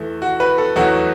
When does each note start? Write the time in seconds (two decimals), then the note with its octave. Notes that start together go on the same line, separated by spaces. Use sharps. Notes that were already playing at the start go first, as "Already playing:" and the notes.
Already playing: E2 E3 A3
0.22 F#4
0.40 B4
0.58 A4
0.76 E2 B2 F#3 A3 F#4